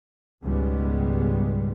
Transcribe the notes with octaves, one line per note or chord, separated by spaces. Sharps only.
C#2 G#2 B2 G3 G#3 B3